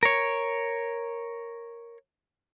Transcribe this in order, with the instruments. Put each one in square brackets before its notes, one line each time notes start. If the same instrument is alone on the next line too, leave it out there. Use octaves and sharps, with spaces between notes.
[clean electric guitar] A#4 C#5